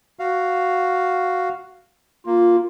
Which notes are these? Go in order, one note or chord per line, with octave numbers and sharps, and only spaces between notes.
F#4 F5
A#3 F4